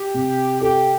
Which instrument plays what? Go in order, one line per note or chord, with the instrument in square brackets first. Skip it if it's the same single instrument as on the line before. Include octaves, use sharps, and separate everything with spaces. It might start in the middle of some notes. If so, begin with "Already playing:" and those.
Already playing: [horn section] G4
[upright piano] C3
[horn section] G4 [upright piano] A4